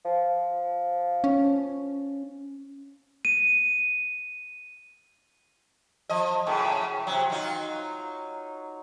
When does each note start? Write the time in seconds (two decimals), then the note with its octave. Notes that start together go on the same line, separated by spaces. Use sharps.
0.05 F3
1.24 C#4
3.25 D#7
6.09 F3 D#5
6.46 F#2 A2 C#3
7.07 C3 F#3
7.30 F#3 D#4 F4